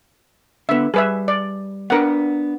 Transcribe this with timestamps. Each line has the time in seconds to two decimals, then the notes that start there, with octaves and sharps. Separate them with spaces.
0.69 D3 B3 E5
0.94 G3 G#4 B4 E5
1.28 D5
1.90 B3 D4 A#4 B4 F#5